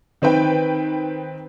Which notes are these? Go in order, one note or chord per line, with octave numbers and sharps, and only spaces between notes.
D#3 C4 B4 G5